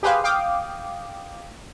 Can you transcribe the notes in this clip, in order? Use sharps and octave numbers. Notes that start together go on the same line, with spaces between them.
G4 G#4 B4 C5 F5
F5 G5 D6 D#6